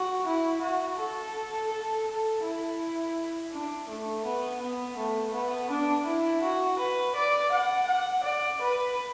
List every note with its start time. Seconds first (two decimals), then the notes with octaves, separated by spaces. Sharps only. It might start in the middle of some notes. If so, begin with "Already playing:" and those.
Already playing: F#4
0.26 E4
0.62 F#4
0.99 A4
1.71 A4
2.07 A4
2.44 E4
3.52 D4
3.89 A3
4.25 B3
4.62 B3
4.98 A3
5.34 B3
5.70 D4
6.06 E4
6.43 F#4
6.79 B4
7.15 D5
7.52 F#5
7.87 F#5
8.24 D5
8.61 B4